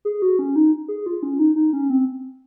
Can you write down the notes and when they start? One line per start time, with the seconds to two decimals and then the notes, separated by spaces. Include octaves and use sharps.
0.05 G#4
0.22 F#4
0.39 C#4
0.56 D#4
0.88 G#4
1.06 F4
1.23 C#4
1.39 D#4
1.56 D#4
1.73 C#4
1.90 C4